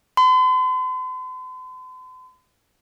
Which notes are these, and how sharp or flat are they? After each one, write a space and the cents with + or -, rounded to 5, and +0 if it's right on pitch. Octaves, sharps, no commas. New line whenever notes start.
C6 -45